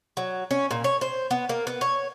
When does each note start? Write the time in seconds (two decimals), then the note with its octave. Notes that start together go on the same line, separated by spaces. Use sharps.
0.17 F#3
0.51 C#4
0.71 A#2
0.84 C#5
1.01 C5
1.31 B3
1.49 A#3
1.67 B3
1.81 C#5